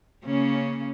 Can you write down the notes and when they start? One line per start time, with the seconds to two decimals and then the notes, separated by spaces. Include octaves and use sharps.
0.25 C#3 A#3 C#4